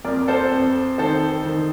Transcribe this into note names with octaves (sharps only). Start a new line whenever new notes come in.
F2 A#4 D5
A4 C5
F2
D#3 A4 C5
D#3